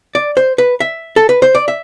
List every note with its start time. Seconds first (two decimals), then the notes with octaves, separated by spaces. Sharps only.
0.15 D5
0.37 C5
0.58 B4
0.80 E5
1.16 A4
1.29 B4
1.42 C5
1.55 D5
1.68 E5